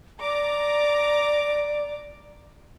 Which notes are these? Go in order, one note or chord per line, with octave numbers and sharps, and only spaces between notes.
D5 A#5 D6